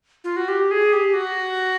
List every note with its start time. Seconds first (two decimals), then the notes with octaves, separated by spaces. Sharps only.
0.24 F4
0.36 F#4
0.48 G4
0.71 G#4
0.93 G4
1.14 F#4